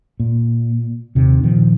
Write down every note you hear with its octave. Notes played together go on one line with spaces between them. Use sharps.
A#2
D#2 C3 D#3
A#2 D#3 F3